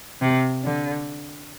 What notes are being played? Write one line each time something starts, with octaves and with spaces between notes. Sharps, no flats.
C3
D3